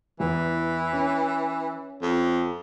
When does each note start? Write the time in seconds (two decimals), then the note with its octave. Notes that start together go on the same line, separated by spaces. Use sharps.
0.20 E2 E3
0.93 C#4
2.02 F2